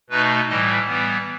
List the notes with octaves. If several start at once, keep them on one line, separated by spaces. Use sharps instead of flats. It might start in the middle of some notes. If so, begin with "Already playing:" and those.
B2 A3 D#4 B4
A2 E3 G3 D#5
E3 G3 B3